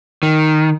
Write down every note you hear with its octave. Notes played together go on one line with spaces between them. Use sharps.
D#3